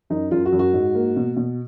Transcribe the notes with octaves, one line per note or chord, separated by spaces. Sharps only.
F#2 D#4
F#2 F4
F#4
F#2
F#4
G#2
A#3
B2
B2